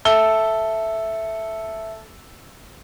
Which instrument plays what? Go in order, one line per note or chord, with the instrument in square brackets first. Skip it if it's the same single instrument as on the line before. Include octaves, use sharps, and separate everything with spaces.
[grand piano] A4 E6 G7 [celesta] E5